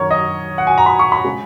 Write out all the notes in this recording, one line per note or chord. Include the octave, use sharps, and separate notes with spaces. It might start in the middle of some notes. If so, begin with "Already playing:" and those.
Already playing: F#2 D#3 F#3 A#4 C#5
D#5
F#5
G#5
A#5
B5
C#6
B5
C#3 G#3